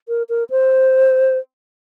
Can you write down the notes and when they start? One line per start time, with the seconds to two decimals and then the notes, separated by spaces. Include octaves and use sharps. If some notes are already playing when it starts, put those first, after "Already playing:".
0.08 A#4
0.29 A#4
0.50 C5